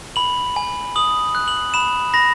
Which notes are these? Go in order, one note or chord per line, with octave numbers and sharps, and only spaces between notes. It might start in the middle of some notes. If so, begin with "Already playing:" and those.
B5 F#7
G#5
D#6 F#7
F#6
F#7
B5 E7
B5 A#6